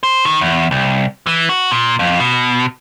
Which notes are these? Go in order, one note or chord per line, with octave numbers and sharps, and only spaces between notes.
C5
D#3
E2
C2
E3
F#4
A#2
F2
B2